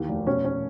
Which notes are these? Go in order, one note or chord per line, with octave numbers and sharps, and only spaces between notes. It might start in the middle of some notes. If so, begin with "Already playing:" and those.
Already playing: D#2 E3 G4
F1
B2 C#4
C#4